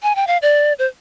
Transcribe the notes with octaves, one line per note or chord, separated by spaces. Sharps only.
G#5
G5
F5
D5
C5